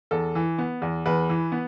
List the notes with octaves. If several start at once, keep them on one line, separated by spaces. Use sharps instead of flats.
E2 A4
E3
B3
E2
E2 B4
E3
B3